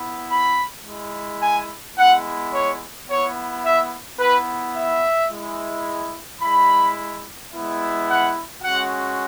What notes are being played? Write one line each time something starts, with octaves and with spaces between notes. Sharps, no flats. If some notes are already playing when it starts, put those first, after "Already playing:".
Already playing: B3 E4
B5
G#3 E4
G#5
G#3 B3 E4 F#5
C#5
B3 E4 C#5
E5
B3 E4 B4
E5
G#3 E4
G#3 E4 B5
G#3 B3 E4
F#5
G#3 C#4 F#4 F#5